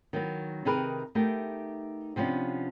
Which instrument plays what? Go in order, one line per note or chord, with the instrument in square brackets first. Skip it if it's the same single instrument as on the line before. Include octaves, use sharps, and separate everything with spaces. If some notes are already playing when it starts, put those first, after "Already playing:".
[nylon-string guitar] D#3 F#3 B3
C3 D#3 D#4 G#4 A#4 B4
A3 B3 D#4 G4 A#4
C3 F3 B3 C#4 D4